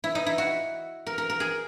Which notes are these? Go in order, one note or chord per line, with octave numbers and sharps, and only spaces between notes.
E4
D#4
E4
F#4
A#4
A#4
A#4
G#4